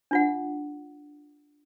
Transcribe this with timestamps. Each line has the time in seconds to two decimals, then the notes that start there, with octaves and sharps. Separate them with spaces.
0.11 D4 F4 F#5